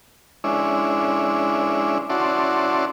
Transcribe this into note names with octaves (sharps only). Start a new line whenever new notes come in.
G#3 C#4 D4 E4
C#4 E4 F#4 D5 A5 C6